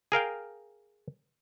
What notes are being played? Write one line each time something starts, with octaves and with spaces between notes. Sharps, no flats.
G#4 A#4 F5 G5